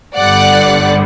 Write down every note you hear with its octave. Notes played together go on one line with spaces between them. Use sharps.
G1 G2 D3 G3 B3 D5 F#5